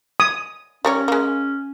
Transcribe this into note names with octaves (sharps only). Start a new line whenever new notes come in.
D#6
G3 C#4 A#4 C#5
G#3 A#3